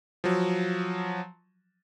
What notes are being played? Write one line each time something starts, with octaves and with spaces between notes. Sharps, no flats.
F3 F#3